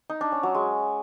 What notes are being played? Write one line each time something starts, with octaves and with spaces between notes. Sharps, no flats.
D#4
D4
C#4
F#3
G#3